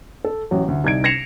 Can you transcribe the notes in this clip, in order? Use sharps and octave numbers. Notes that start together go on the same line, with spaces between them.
A4
A1 F#3
D2
C2 D#4 G#6 D7
G#6 A#6 C7 C#7 E7 F7